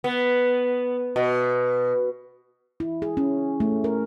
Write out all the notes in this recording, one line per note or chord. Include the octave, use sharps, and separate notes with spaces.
B3
B2
E4
G#4
C#4
A3
A#4